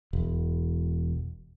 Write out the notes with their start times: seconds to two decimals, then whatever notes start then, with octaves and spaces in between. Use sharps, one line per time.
0.13 E1